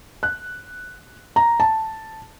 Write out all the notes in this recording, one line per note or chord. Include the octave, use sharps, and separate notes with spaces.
F#6
A#5
A5